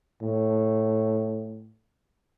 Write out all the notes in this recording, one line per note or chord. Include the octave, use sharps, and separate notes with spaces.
A2